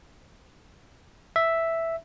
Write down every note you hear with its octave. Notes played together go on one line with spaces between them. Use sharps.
E5